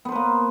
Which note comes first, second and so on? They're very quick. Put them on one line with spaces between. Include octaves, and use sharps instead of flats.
B3 C5 B4 A#3